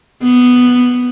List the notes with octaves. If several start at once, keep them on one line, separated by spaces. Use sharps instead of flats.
B3